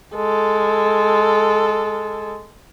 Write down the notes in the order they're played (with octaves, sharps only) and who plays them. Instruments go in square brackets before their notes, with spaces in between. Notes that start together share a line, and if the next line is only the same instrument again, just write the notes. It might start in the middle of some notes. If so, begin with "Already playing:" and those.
[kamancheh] G#3 A4